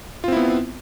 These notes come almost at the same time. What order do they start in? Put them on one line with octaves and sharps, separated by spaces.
F4 C4 E4 B3